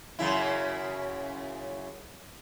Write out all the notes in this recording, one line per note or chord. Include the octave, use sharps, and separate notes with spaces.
F#2 C#3 E4